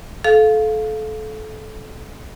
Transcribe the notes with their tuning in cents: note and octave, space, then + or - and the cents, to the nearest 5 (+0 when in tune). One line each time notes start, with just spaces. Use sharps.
A4 -25 F5 +0